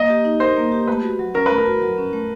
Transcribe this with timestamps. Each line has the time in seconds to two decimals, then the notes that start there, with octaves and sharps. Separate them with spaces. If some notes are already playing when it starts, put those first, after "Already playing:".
Already playing: A#3 D#5
0.10 G4
0.25 D#4
0.40 A#4 C5
0.56 A#3
0.72 G4
0.88 A3 B4
1.03 F#4
1.19 F#3
1.34 C#4 A#4
1.46 A3 B4
1.58 A#4
1.66 F#4
1.82 F#3
1.98 C#4
2.13 A3